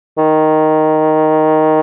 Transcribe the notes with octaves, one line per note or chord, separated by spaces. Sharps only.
D#3